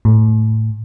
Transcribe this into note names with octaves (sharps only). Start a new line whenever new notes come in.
A2